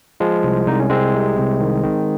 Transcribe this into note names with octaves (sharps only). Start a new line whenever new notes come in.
F3 G#3
C2
C2 D#4
C#4
C2 G#3 C4
C3
C2
D#3
D#3